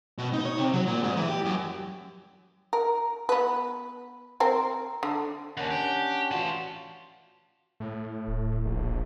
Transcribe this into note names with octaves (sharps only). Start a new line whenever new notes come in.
B2
D#4
C#5
C3
F#3
A#2
G#2
E3
G4
F#2
A#4
B3 B4
C4 A#4
D3
D#2 C#4 D4 F#5
G4
E3 F4 F#4 A5
A2
D1
A#1